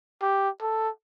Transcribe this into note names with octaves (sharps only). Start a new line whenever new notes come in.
G4
A4